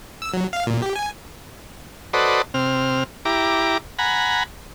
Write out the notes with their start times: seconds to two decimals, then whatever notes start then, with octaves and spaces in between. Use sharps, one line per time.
0.22 E6
0.33 F#3
0.53 F5
0.67 A#2
0.82 G4
0.96 G#5
2.13 F#4 A4 B4 C5 D5 D#5
2.54 C3 C4 F6
3.25 E4 G4 A#5 D6
3.99 F#5 G#5 A#5 B5